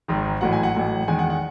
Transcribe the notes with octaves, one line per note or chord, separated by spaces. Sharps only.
G#1 G#2 D#3
A1 A2 F#3 F#5
G#5
F#5
A1 A2 F#3
E2 D#3 G#3 G#5
F#5
F#5